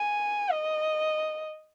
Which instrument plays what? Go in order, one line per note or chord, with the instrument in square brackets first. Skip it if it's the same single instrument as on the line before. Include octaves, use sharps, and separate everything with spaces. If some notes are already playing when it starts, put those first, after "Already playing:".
Already playing: [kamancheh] G#5
D#5